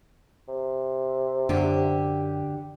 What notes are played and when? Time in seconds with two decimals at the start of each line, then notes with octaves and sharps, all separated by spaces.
0.48 C3
1.49 F#2 D3 G4